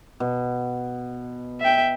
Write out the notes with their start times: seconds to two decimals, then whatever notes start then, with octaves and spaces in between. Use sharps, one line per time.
0.20 B2
1.61 E5 G5